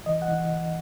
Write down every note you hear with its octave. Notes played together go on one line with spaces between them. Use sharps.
E3 D#5
F#5
E3